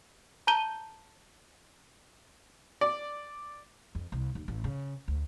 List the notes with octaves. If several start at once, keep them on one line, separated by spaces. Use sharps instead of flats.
A5 A#5 G6 D#7 G7
D5
F2
C2
D#2
A1
C#3
D2